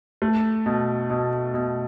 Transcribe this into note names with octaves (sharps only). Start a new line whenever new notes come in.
A3
B2
B2
B2